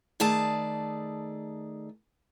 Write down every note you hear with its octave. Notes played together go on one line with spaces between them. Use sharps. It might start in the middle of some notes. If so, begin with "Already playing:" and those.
D#3 A3 G#4 D5 A5